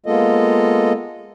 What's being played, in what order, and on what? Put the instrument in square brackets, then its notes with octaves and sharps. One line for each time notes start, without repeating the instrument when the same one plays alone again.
[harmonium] G#3 A#3 B3 F4 A4 D#5